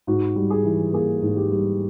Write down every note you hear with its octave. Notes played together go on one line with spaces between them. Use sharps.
G#2 F#4
G3
G#4
E3
A#3 G#4
G#2
G4
G3